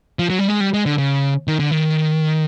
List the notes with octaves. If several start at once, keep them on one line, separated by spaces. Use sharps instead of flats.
F3
F#3
G3
G#3
G3
G#3
D3
C#3
D#3
D3
D#3